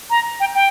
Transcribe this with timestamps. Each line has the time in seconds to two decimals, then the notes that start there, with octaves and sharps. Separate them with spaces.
0.10 A#5
0.40 G5
0.55 G5